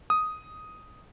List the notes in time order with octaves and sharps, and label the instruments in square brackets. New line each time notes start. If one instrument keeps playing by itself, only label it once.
[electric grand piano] D#6